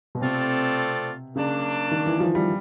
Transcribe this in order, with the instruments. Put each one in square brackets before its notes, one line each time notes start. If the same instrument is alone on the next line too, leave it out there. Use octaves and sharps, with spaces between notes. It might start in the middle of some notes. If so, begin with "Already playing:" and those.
[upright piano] B2
[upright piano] C3 [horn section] A3 C4 F4 A4 D5
[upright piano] C#3 [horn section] F#3 A#3 D4
[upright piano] D#3
E3
F3
G3